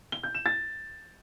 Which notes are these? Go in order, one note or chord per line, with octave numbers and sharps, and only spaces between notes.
G7
G6
E7
A6